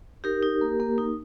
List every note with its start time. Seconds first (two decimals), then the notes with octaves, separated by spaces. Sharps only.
0.24 D#4 G4 A#4
0.43 D#4
0.61 A#3
0.80 A#3
0.98 D#4